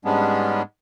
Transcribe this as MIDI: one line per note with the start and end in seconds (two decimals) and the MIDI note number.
0.05 0.62 44
0.05 0.62 55
0.05 0.62 56
0.05 0.62 59
0.05 0.62 61
0.05 0.62 62